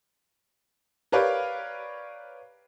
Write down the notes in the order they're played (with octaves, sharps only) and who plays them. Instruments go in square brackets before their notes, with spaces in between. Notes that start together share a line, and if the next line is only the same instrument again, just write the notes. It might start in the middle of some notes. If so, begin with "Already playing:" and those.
[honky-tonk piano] G4 A#4 B4 C#5 D5 F5